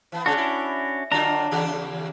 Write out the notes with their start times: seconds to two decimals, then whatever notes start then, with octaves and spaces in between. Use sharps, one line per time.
0.12 E3 B3
0.26 C#3 G#3 C#4 D4 F#4
0.37 E4
1.12 D3 F#3 D4 F4 A#5
1.51 D#2 C#3 G4